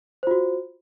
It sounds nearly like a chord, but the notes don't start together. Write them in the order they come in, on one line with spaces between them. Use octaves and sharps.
C5 F4 F#4